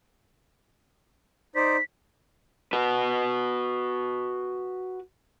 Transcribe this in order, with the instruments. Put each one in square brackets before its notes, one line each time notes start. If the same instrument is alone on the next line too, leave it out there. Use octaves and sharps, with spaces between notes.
[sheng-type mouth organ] D#4 C5 D5 [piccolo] B6
[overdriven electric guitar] F#4 B4